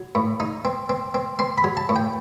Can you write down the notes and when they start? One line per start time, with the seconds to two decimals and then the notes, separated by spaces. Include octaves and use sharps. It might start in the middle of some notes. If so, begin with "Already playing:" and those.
Already playing: F#3
0.15 A2
0.40 D#4
0.65 C4
0.89 C4
1.14 C4
1.39 C4 C6
1.58 B5
1.64 F#3
1.77 A5
1.89 A2
1.96 G5